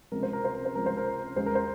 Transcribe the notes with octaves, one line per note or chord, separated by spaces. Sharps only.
C#2 C3 F3 G#3 A#4
C5
A#4
C5
A#4
C5
C#2 C3 F3 G#3 A#4
C5
A#4
D#2 C#3 G#3 C5
A#4
C5